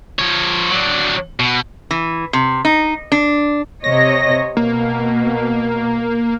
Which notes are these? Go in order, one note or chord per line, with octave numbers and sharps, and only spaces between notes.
F3 C#5
F#3 D4
B2
E3
C3
D#4
D4
C3 C#5 D#5 A#6
B2 A#3